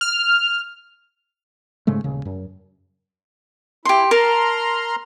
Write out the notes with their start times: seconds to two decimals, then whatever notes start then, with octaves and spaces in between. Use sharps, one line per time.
0.01 F6
1.87 G#2 C#3 G#3 A3
2.04 D#1 C#3
2.25 F#2
3.85 E4 G4 C6
4.11 A#4 A5 A#5 C6 F6